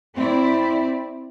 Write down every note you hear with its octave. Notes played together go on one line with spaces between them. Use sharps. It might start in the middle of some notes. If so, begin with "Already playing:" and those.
C4 E4 D5